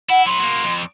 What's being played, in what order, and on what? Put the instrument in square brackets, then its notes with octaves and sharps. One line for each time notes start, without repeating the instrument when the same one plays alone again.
[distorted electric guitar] E4 [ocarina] F#5
[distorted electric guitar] F#3 B4 [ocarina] C6
[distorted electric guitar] F#3 A#3
F2